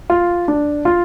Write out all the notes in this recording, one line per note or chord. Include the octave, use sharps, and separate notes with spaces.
F4
D4
F4